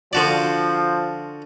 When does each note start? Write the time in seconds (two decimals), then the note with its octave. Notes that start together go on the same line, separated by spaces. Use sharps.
0.13 D3 F3 F#4 D5